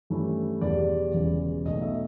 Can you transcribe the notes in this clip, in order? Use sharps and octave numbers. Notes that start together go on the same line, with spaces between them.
G2 E3 A3 C#4 E4
E2 B2 G3 B3 D5
E1 E2 C#3 E3
B1 B2 F#3 A3 D#5
E5